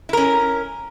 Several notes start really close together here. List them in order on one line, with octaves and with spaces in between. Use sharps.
E4 A#4 C#4